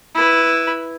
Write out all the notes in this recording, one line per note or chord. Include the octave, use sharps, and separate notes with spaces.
E4 B4